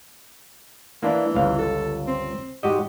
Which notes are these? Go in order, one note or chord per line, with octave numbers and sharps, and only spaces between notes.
E3 A#3 D4 E4
G1 C#2 F5
A4
C4
G#2 F#4 G4 D#5